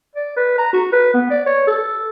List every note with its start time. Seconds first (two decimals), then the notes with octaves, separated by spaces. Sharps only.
0.15 D5
0.37 B4
0.58 A#5
0.73 F#4
0.92 B4
1.14 B3
1.30 D5
1.46 C#5
1.67 A4